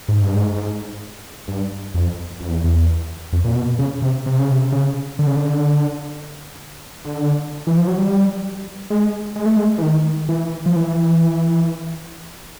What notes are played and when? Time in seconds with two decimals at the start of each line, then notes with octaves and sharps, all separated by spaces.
0.08 G#2
0.21 G2
0.36 G#2
1.48 G2
1.94 F2
2.41 F2
2.49 E2
2.64 E2
3.33 F2
3.44 A#2
3.56 B2
3.79 C#3
4.02 C3
4.26 C3
4.39 C#3
4.51 C3
4.72 C#3
5.19 D3
5.27 C#3
5.36 D3
7.05 D3
7.67 E3
7.77 F3
7.87 F#3
7.98 G3
8.90 G#3
9.36 G#3
9.46 A3
9.56 G#3
9.78 E3
9.82 D#3
10.29 E3
10.66 F3
10.76 E3